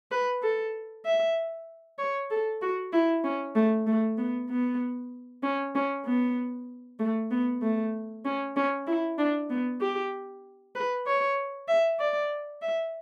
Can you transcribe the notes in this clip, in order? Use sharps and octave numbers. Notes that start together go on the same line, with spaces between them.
B4
A4
E5
C#5
A4
F#4
E4
C#4
A3
A3
B3
B3
C#4
C#4
B3
A3
B3
A3
C#4
C#4
E4
D4
B3
G4
B4
C#5
E5
D5
E5